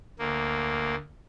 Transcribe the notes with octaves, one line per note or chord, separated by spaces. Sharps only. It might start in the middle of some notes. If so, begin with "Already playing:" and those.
D2 A#3